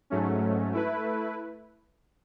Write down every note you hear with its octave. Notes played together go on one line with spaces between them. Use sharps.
G#2 F#3 A3 C#4
A3 E4 B4